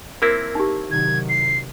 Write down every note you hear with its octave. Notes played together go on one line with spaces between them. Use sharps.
A#3 C4 E4 A#4
D#4 G4
C3 D#3 F#3 G#6
C7